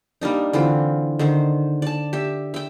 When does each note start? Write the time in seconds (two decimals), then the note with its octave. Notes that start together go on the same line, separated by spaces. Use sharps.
0.21 G3 A#3 D4 D#4
0.53 D3 E3 C4 F4
1.19 D3 D#3 C5
1.82 D5 A5
2.13 G4 E5
2.54 E5 G5